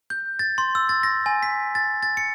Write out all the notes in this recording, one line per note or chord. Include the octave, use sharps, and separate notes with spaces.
G6
A6
C6
E6
A6
A#6
G#5
B6
A6
A6
C#7